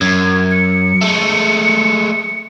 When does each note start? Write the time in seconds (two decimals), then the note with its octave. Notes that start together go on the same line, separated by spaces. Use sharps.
0.01 F#2 G#6
0.51 C#7
1.01 G#3 A3